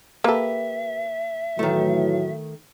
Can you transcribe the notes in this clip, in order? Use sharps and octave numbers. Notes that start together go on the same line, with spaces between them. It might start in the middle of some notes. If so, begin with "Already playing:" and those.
A#3 G4 A4 B4 E5
A2 D#3 E3 F#3 A3